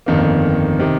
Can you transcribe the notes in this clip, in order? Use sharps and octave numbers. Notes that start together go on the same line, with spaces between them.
G1 F2 D#3 A#3
C3 D#3